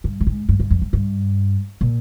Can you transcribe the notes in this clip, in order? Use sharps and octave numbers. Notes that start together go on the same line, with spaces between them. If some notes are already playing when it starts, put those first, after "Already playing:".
G2
G2
G#2
G2
G2
F2
G2
G2
A#2